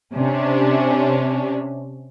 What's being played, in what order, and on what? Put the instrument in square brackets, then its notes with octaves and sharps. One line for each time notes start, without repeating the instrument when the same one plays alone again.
[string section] C3 C#4 D4